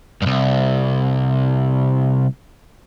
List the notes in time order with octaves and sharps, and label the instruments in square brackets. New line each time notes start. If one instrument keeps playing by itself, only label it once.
[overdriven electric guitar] C2 G2